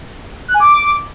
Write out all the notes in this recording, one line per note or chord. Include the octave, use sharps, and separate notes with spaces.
F#6
G#5
D6